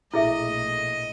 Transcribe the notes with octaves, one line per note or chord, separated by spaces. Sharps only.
A#1 B2 A3 E4 G#4 D#5 E5